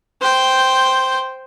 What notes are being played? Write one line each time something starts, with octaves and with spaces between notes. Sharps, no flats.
C5 G5